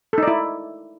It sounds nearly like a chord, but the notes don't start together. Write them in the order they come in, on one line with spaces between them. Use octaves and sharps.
A4 D#4 D5 E4